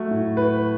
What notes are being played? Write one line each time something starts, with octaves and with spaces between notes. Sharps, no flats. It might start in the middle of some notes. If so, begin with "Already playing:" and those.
Already playing: F#3 A3 F#4
A2
B4